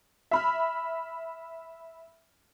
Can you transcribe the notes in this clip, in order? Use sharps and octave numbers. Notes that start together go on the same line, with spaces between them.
E5 B5 F6